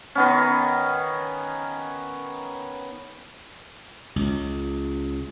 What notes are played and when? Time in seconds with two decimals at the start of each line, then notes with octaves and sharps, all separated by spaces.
0.15 D#3 B3 C#4
4.16 C#2